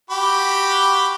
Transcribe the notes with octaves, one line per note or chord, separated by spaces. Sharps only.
F#4 G4 B5